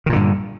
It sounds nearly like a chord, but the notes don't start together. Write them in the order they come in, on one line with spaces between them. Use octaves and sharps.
D#3 A#2 D3 G2